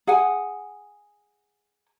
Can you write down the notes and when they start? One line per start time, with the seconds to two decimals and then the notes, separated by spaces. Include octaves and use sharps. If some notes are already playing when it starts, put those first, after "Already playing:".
0.07 G#4 F#5 G#5